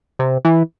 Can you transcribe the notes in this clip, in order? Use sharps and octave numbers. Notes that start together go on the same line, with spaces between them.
C3
E3